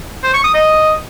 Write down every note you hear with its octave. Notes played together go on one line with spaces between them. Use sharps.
C5
C#6
D#6
D#5